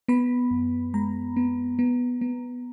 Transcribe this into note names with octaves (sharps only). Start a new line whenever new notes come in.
B3 B5
F#2
G#3 A#5
B3
B3
B3